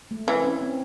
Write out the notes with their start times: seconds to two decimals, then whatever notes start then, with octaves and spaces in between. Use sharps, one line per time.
0.11 A3
0.27 E3 C4
0.44 C#4
0.61 C4